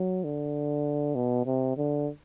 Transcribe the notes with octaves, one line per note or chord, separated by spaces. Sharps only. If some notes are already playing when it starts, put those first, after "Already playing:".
Already playing: F#3
D3
B2
C3
D3